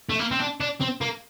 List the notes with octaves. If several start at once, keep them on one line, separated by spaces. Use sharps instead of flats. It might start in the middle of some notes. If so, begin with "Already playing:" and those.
A3
A#3
C4
D4
D4
C4
A#3